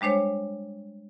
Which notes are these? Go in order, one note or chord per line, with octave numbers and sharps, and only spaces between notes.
G3 G#3 D4 C5 C#5